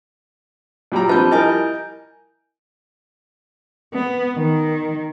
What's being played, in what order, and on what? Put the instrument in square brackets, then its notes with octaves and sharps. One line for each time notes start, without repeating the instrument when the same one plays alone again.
[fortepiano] A#2 G3 [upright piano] F#3 A#5
[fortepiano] F3 G3 [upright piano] C4 D4 B4 [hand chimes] A5 G6
[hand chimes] E4 G#5 G6 [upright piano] A#4 D#5
[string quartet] B3
D#3